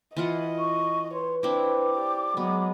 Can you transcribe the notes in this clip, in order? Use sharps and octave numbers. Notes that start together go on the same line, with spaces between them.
E3 F4 D#5 F#5
C#6
B4 C#5 C6
C4 D4 E4 D6
G4 D5
F#3 G#3 B3